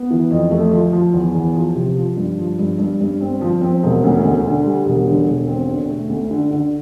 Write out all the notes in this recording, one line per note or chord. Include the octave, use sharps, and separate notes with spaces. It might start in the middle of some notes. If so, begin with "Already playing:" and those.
Already playing: B3
E3
F2
A3
F3
F3
E2
E2
F3
C3
F3
G2
F3
G2
G2
G2
C4
F3
C4
E1
D2
D2
D3
G3
E1
D3
E1
C4
D3
A3
D2
D3
D3